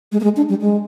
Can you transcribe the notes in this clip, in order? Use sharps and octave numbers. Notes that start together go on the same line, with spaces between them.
G#3
A#3
G#3
D4
G3
G#3